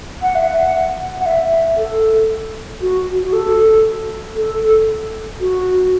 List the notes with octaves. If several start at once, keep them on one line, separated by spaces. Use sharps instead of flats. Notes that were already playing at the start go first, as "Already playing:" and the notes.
F#5
E5
F#5
F#5
E5
A4
F#4
F#4
A4
A4
F#4